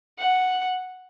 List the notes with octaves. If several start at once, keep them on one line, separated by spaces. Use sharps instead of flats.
F#5